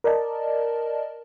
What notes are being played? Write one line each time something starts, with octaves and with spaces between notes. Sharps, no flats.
A#4 D5 D#5 A5